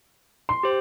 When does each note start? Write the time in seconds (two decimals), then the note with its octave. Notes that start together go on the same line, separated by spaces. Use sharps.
0.49 C6
0.63 G4 C5